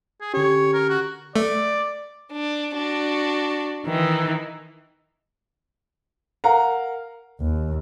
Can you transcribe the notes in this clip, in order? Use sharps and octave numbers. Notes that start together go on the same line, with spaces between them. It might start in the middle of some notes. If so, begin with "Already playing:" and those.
G#4
D3 C#4 G4 C#5
A#4
F#4
A3 D5
D4
D4 F#4
D#3 E3 D#4
A#4 F5 F#5 A#5
D#2